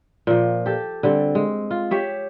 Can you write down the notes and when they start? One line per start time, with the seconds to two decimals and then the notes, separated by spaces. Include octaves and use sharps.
0.27 A#2 F3
0.66 G4 A4
1.03 D3 G3 C4
1.35 G#3
1.71 F4
1.91 G4 C#5 E5